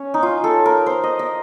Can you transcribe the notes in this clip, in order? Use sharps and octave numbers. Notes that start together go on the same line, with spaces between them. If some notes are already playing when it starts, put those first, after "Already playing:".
Already playing: C#4
D#4
F4
A4
A#4
C5
D#5
D#5